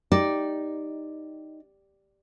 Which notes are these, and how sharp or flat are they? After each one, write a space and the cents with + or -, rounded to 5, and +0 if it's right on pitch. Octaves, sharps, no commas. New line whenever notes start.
D#4 +0 G4 +0 D5 +0